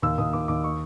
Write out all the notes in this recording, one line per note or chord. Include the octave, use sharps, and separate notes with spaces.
D#2 E6
D#2 D#6
D#2 D6
D#2 D6
C#6